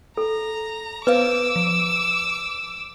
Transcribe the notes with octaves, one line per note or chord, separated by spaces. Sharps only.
A4 A#5
B3 B4 C5 F5 D6 E6
F3